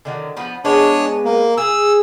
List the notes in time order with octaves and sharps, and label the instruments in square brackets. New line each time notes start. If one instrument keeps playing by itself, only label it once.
[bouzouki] D3 D#3 F#3
F3 B3
[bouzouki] G#3 B3 [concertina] D4 C#5
[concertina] A#3
[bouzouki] G#4 [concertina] E6